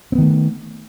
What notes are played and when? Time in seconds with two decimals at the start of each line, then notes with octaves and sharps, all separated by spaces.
0.12 C4
0.15 B3
0.18 D#3
0.21 A3